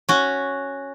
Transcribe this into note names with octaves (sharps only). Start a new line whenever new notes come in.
C#4 F#4